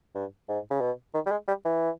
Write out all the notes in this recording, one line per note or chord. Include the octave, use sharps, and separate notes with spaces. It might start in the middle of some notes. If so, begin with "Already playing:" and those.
G2
G#2
C#3
B2
D#3
G3
G#3
G3
E3